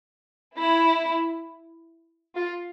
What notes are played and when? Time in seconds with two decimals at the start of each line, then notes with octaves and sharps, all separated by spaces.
0.58 E4
2.36 F4